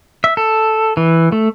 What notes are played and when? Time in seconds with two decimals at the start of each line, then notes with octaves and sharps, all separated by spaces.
0.24 E5
0.37 A4
0.97 E3
1.32 A3